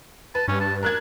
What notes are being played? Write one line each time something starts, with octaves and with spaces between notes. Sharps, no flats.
B4 A5
G2 C#4
A5
D4 A#4 F#6 G#6